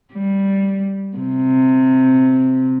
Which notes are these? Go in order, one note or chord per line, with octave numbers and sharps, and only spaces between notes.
G3
C3